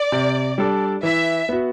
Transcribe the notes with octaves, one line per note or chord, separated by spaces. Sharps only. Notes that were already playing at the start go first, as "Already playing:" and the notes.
Already playing: D5
C3
G3 D4 A4
E3 E5
B3 F#4